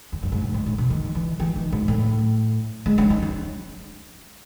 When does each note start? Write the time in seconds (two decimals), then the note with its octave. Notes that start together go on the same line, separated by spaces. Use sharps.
0.12 E2
0.23 F#2
0.32 G#2
0.42 A2
0.54 G#2
0.66 A2
0.78 B2
0.90 D#3
1.05 D#3
1.15 E3
1.40 E3
1.56 D#3
1.72 G#2
1.88 A2
2.86 G#3
2.98 C#4
3.10 D#4
3.23 C#4